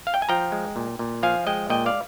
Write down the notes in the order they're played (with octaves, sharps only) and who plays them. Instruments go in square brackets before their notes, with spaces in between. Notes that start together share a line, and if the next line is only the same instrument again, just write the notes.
[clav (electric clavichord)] F5
G5
G#5
F3 G5 A#5
G#3
A#2
A#2
F3 F5 G#5
G#3 D#5 G5
A#2 D#5 G5
D5 F5